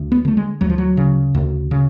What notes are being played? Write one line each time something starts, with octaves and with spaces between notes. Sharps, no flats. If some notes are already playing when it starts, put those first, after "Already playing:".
Already playing: D2
B3
D3 A3
G#3
D2 F#3
F3
F#3
C#3
D2
C#3